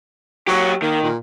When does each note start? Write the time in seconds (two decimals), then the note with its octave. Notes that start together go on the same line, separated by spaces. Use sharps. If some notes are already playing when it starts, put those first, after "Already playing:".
0.47 F#3 G4 C#5
0.82 D#3 A#3
1.03 A#2